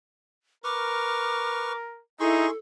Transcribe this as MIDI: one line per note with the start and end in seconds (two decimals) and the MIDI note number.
0.64 2.02 70
0.64 1.73 71
0.64 1.73 85
0.64 1.75 86
0.64 1.73 89
2.20 2.46 63
2.20 2.46 64
2.20 2.50 68
2.20 2.58 69
2.20 2.50 84
2.20 2.50 85